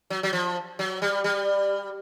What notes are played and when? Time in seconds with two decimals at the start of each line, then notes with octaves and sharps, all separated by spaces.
0.10 F#3
0.23 F#3
0.33 F3
0.79 F#3
1.02 G3
1.24 G3